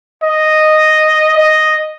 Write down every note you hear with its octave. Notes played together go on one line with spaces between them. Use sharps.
D#5
D#5